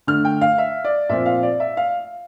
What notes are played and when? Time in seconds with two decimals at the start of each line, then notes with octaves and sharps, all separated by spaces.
0.07 D3 A3 D4 F6
0.25 G5
0.42 F5
0.58 E5
0.85 D5
1.09 A#2 F3 C4 F4 E5
1.26 F5
1.43 D5
1.60 E5
1.77 F5